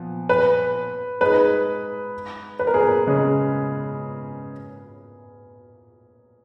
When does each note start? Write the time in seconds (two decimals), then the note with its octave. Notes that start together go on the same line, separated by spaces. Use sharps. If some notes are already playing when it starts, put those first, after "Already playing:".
Already playing: A#2 F3 B3
0.29 B4
1.21 G#3 D#4 G#4 B4
2.59 B4
2.67 A#4
2.74 G#4
2.81 A#4
3.06 C#3 G#3 C#4 G#4